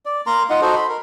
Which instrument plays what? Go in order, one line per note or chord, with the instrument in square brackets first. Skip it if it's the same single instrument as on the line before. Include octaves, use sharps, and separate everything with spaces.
[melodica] D5
A#3 A#4 A#5 C6
D#4 F4 D#5 F#5
D#4 F#4 A4 C5
B5 C6
A#4